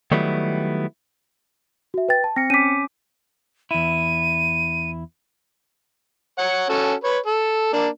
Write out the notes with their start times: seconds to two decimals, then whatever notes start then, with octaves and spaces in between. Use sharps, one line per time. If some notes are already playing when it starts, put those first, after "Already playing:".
0.12 D#3 F#3 G3 A3 B3 E4
1.94 F#4 E5
2.09 B4 G5 A6
2.24 A5
2.36 C4 A#6 C#7
2.50 C#4 D6 B6 D#7
3.71 E2 E4 D#7
6.39 C#5 F#5
6.69 C#4 F#4 A4
7.04 B4 C#5
7.26 A4
7.73 A#3 D4